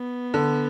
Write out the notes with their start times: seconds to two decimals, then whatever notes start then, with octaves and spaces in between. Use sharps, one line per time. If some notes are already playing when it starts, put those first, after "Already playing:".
Already playing: B3
0.34 D3